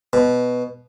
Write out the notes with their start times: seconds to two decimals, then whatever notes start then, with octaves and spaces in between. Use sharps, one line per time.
0.13 B2